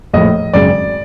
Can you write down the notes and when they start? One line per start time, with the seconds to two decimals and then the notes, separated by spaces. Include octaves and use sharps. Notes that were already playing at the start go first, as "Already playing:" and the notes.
0.14 A#1 A2 F3 D#5
0.54 G#1 F#2 C#3 D5